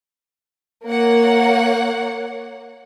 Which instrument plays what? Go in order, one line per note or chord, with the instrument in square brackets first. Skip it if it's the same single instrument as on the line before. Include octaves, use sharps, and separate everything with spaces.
[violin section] A#3 C#5 F#5